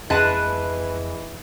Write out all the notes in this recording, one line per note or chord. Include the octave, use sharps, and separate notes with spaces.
F2 E3 G#3 B4 A5 F#6